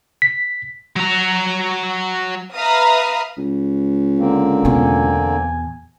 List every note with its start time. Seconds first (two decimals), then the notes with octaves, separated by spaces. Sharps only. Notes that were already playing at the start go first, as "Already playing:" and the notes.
0.22 B6
0.96 F#3 A#5
2.54 B4 E5 F5 A#5 D#6 F6
3.37 C#2
4.19 D3 A#3 C4
4.65 E2 B2 G#5